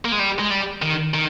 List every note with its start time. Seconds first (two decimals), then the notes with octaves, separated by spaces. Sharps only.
0.05 A#3
0.12 G#3
0.19 G3
0.39 G#3
0.50 G3
0.82 D#3
1.14 D#3